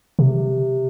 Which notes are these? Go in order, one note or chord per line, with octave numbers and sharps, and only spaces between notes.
C3